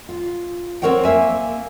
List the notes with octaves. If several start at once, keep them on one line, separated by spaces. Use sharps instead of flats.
F4
C4 C#4 A#4 C#5 F#5 G5
A#3 E5 G#5